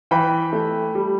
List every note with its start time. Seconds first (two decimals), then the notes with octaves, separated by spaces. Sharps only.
0.11 E3 G5 B5
0.53 A3
0.95 G3